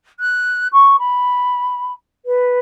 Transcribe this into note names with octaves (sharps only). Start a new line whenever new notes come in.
F#6
C#6
B5
B4